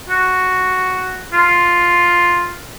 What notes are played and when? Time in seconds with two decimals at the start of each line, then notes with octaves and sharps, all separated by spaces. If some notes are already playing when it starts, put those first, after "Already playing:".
0.09 F#4
1.33 F4